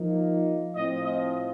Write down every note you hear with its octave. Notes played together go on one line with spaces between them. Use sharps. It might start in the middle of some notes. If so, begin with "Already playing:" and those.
Already playing: F3 A#3 D#4
A2 F3 C4 D#5
D#5